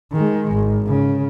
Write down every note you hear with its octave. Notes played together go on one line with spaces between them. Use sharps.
D#3 G#3
G#1
C#3